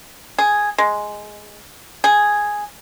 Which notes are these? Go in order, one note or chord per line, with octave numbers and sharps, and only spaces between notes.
G#4
G#3
G#4